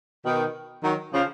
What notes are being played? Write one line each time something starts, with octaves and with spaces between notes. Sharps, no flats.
B2 D#3
D#3 F#3
C#3 F3